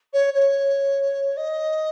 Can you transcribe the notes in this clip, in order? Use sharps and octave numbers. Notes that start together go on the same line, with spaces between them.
C#5
C#5
D#5